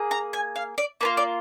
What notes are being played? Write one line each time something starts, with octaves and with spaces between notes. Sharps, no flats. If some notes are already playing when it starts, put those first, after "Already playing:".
Already playing: A#3 G#4
A#5
G#5
F5
D5
A#3 D4 F4 B4
D5